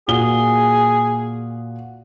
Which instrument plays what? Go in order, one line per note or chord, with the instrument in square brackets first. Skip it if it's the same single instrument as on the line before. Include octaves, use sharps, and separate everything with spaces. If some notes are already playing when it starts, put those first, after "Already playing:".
[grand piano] A#2 F#4 G7 [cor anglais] G#4